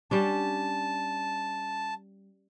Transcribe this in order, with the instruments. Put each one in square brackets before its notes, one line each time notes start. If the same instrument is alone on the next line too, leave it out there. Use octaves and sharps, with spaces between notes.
[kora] G3 C#4 D4 [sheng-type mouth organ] A5